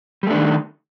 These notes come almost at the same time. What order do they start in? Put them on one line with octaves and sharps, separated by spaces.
G3 A3 D4 D#3